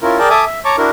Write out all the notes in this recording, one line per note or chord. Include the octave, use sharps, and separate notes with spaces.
C#4 E4 F4 A#4
G#4 A#4 D5 G5 A5
A4 E5 G#5 A5 D6 D#6
E5
C#5 A5 A#5 C#6 D6
D4 E4 F#4 A#4